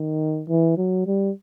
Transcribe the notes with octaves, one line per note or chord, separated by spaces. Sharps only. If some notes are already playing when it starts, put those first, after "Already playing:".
Already playing: D#3
E3
F#3
G3